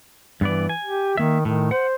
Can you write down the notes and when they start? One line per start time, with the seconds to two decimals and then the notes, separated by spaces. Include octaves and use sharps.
0.41 G2 E3 B3 D5
0.69 G#5
0.84 G4
1.17 D#3 A#3 E5
1.45 A2 D#3
1.71 C5 F#5